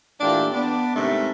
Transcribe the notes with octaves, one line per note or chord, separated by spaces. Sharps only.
A#2 E3 A3 D4 F4 G4
B3 D4
G#2 C3 D#3 A3